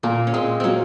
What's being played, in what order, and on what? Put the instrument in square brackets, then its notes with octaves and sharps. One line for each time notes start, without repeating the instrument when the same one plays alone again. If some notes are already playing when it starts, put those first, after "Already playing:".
[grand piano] A#2 [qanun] A#3
[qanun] C#4
[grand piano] A#2 [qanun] G#3 C4
[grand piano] F#3 [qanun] A#3 C4 C#4